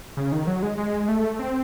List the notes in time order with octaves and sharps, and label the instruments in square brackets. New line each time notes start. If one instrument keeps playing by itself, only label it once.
[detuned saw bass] C#3
D#3
F#3
G#3
G#3
A3
C4